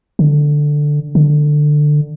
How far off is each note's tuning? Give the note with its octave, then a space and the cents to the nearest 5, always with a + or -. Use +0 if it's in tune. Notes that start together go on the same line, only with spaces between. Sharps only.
D3 +5
D3 +15